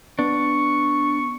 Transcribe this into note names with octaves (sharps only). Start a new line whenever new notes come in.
B3 D4 C#6